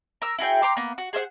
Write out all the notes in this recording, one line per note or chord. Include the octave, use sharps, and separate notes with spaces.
A#4 E6
E4 F#4 G#4 G5
G5 A#5 C6 D6
A#3 B3
F#4
G#4 C5 E5 F#5